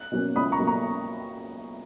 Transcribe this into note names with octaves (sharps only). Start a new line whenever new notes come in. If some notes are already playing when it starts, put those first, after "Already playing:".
Already playing: F#6
B2 F#3 A#3 C#4
C#2 B5 D#6
A#5 C#6
B2 F#3 A#3 C#4
A#5 C#6